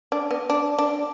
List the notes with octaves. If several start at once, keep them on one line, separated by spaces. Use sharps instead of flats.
D4
B3
D4
D4